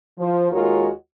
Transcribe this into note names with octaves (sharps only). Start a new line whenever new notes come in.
F3
D#2 G#3 F4 F#4 A#4 C#5